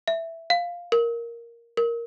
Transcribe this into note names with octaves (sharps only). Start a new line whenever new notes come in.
E5
F5
A#4
A#4